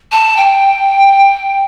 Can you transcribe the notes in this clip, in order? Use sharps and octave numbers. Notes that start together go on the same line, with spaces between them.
A5
G5